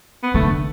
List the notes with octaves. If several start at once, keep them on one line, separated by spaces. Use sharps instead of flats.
B3
D3 A3